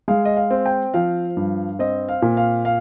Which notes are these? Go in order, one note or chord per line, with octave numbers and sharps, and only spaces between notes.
G#3 F5
D#5
F5
C4
G5
F3 F5
G2
C4 D#5
F5
A#2
F5
F5